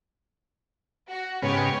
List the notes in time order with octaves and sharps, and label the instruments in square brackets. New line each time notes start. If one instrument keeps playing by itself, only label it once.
[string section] F#4
[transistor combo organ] G#2 C#3 B3 [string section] G4 C#5